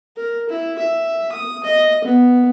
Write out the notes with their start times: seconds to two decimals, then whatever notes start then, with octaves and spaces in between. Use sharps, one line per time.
0.17 A#4
0.49 E4
0.79 E5
1.32 D#6
1.64 D#5
2.04 B3